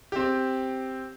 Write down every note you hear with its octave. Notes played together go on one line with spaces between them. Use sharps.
C4 G4